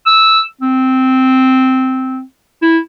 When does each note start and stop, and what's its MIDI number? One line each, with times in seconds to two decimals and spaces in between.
0.06 0.41 88
0.61 2.21 60
2.62 2.78 64